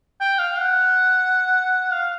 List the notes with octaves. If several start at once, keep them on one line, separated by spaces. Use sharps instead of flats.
G5
F5
F#5
F5